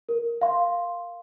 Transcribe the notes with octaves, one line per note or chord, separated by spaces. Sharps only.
A#4
F5 C6